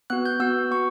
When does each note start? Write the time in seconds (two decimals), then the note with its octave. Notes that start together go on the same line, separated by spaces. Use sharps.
0.10 B3 F#4 F#6
0.26 G6
0.40 B3 F#4 E6
0.71 B3 F#4 C#6